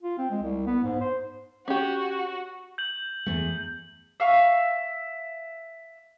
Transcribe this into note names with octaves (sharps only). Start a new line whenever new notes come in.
F4
C4
G#3
C2
B3
G#2
C5
C#4 F#4 G4
G6 F#7
E2 A3
E5 F5 C#6